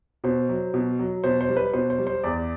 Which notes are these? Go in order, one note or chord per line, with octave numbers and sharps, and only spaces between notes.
B2 C5
F#3
B2
F#3
B2 C5
C5
G3
B4
B2 C5
C5
G3
C5
E2 D5